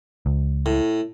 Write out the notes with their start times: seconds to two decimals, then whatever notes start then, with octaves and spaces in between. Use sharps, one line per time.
0.26 C#2
0.66 A2